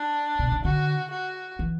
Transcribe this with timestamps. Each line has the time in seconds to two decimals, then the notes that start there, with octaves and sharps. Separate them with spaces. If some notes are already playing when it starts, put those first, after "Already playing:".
Already playing: D4
0.39 B2
0.52 C#3
0.65 D3 F#4
1.11 F#4
1.59 E3